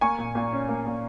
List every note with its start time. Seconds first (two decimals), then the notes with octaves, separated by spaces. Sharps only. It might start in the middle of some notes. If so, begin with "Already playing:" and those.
0.01 A#3 G#5 C#6
0.18 A#2
0.35 A#2
0.53 C#4
0.69 A#3
0.86 A#2